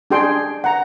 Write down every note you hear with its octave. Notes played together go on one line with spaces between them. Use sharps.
D4 G4 G#4 G5 C6
F#5 A#5